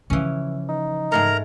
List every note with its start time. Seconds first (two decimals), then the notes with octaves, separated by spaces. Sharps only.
0.10 C#3 E3 F3 C#4
0.69 D#4
1.12 G#2 G#3 A3 A#4 A#5